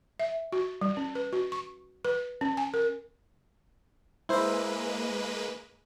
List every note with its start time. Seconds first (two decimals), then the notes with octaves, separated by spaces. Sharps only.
0.20 E5
0.53 F#4
0.81 G3
0.97 C#4
1.15 B4
1.33 F#4
1.52 C#6
2.05 B4
2.41 C#4
2.57 G#5
2.74 A#4
4.29 G#3 A#3 E4 B4 C5